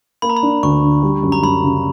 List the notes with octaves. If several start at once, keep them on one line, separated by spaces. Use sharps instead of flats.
A#3 B5
A#5
B5
D4
D2 C#6
D3
G3
F#2
A#5
F#2 B5
C#3